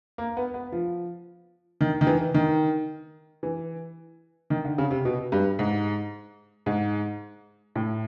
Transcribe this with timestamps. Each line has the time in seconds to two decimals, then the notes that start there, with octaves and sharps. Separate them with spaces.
0.18 A#3
0.37 B3
0.54 B3
0.72 F3
1.81 D#3
2.01 D#3
2.07 E3
2.34 D#3
3.43 E3
4.50 D#3
4.65 D3
4.78 C#3
4.91 C3
5.05 B2
5.32 G2
5.59 G#2
6.66 G#2
7.75 A2